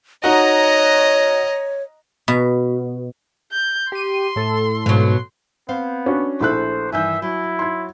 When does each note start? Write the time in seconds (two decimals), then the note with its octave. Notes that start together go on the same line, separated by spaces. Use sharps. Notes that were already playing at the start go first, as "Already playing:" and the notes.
0.24 D#4 F#4 C#5 D#5 A#5
2.28 B2
3.52 G6
3.92 G4 C6 D#7
4.36 A2 A4
4.86 G#2 B2 F#3
5.69 B3 C4 C5 F5
6.06 C#4 D4 F#4
6.41 A#1 A3 E4 A4 C5 F#6
6.92 G2 D#3 E3 E5 G#5 G6
7.22 F#3 E4
7.59 C6 G#6